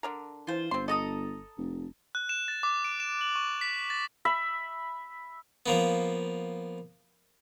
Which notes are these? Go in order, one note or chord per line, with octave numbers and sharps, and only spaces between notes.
D3 D4 A#4
E3 F4 C5
G1 C4 C6
A4 D#5 A#5 D#6
F1
F#6
E7
A6
D6
D7
E7
F#7
C#6
B6
A6
E5 B5
F3 A#3 B3